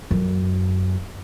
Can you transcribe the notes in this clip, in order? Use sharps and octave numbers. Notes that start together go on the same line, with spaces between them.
F#2